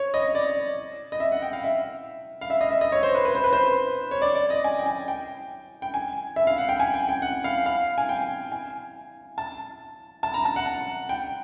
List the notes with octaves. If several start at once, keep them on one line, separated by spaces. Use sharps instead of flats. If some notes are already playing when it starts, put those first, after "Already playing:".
Already playing: C#5
D#5
D5
D#5
E5
F#5
G5
F5
E5
F5
E5
D#5
E5
D#5
C#5
C5
B4
B4
C5
B4
C5
C#5
D5
D5
D#5
G#5
G5
G#5
G5
G5
G#5
E5
F5
F#5
G5
G#5
G5
G5
F#5
F5
F5
G#5
G5
G#5
A5
A5
A#5
A5
F#5
G5